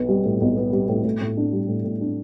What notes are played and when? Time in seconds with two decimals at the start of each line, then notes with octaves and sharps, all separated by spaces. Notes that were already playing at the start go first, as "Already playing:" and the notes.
Already playing: B1 B3
0.09 G3
0.25 A2
0.41 B1
0.57 B3
0.72 G3
0.89 A2
1.04 A2
1.21 A2
1.37 D4
1.53 G3
1.68 A2
1.84 A2
2.01 D4